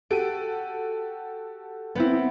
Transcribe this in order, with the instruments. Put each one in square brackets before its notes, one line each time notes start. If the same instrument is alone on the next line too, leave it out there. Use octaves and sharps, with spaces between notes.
[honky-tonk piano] F#4 G4 A4 [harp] D7 D#7
[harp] B3 C4 E4